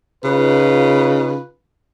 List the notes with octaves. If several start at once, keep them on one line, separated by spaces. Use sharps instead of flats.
C#3 D#4 F4 B4